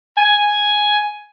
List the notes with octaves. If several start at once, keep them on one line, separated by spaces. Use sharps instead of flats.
G#5